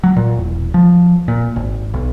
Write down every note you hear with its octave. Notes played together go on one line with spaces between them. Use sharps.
F#3
A#2
E1
F3
A#2
G#1
B1